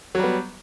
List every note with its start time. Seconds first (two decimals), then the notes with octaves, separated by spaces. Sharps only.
0.15 F#3
0.19 G3
0.23 B3